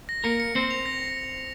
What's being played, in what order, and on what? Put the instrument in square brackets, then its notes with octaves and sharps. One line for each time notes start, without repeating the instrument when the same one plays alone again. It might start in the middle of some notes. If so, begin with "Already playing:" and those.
[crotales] A#6
[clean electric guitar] A#3 A#4 [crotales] C#7
[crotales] C#7
[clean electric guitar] C4 C5 [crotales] C#7
[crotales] F7
A#6